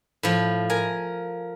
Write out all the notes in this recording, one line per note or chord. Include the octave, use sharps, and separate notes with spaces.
A2 F3
A#4 G#5